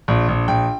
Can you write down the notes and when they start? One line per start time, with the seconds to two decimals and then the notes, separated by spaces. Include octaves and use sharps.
0.08 A#1
0.28 A#1
0.48 A#1 G5